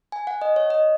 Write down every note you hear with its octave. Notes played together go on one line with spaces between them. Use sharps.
G#5
F#5
D#5
C#5
D#5